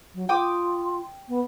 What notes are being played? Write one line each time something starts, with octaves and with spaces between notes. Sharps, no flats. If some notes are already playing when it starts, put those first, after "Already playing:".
F#3
F4 G5 D6 D#6
B3